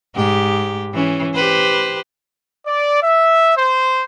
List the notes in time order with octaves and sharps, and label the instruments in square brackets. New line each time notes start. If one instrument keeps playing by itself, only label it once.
[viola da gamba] G#2 G4
E3 C#4
G4 B4 C5
[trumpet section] D5
E5
C5